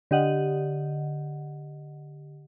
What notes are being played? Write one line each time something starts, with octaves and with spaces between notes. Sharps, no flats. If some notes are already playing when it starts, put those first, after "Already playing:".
D3 G4 D#5 F#5